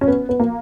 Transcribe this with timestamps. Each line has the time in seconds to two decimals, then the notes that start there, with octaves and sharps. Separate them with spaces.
0.01 C#4
0.08 B3
0.29 B3
0.40 A#3